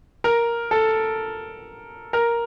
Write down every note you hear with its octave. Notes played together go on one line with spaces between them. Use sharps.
A#4
A4
A#4